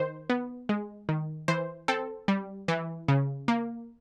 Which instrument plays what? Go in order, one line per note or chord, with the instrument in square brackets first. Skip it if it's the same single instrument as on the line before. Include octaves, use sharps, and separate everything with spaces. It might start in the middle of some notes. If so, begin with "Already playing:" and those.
Already playing: [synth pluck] D#3 C5
B3
G#3
D#3
E3 C5
C4 A4
G3
E3
C#3
A#3